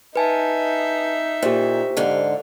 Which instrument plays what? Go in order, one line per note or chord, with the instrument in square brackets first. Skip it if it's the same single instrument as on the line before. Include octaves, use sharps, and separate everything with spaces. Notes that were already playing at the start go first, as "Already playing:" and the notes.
[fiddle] D#4 E5 [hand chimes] B4 G#5 A5
[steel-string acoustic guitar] A#2 [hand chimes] G4 C5
[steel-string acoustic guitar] G#2 D3 F5